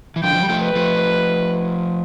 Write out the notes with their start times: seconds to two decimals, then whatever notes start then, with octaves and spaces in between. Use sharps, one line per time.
0.16 E3
0.23 D3 F3 G5
0.33 F3
0.41 G3
0.49 F3 A3
0.63 B4
0.75 F3 A3